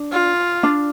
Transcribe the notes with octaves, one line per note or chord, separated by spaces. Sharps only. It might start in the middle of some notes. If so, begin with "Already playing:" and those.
Already playing: D4
F4
D4